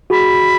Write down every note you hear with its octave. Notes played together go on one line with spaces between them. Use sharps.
F#4 G#4 B5